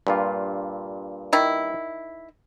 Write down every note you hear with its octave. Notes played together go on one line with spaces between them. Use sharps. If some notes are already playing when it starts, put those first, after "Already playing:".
G2 A#2 F4
D#3 E4